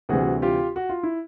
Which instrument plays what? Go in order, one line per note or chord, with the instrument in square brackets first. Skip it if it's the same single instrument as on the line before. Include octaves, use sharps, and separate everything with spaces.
[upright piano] D2 C3 E3 G3 [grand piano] F#4 G#4
[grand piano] F4 G4
F#4
F4
E4